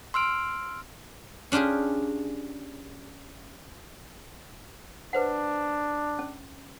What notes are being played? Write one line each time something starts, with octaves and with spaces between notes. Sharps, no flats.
C6 E6 F6 D7
C#4 D4 F4 G4 G#4
D4 B4 C5 F#5
C#4